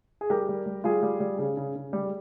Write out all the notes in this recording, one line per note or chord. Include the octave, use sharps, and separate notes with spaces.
G#4
G3 G4 A#4
G3
G3
G3 F4 G#4
G3
G3
C#3
C#3
C#3
G3